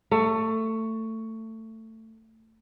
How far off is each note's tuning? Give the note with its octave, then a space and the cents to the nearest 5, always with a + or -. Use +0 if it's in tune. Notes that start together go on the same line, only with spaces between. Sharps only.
A3 +20